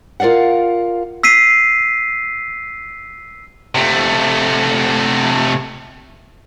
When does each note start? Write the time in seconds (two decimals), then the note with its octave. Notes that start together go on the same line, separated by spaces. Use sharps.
0.20 F4 A#4 D5 F5 F#5
1.23 E6 B6 C7 D#7
3.75 C3 A3